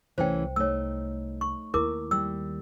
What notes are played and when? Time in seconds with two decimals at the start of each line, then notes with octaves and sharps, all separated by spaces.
0.18 C2 E3 A3 C#4 C5 G5
0.56 A3 D#4 C#5 E6
1.41 C#6
1.74 D#2 E4 A#4 D6
2.11 G3 E6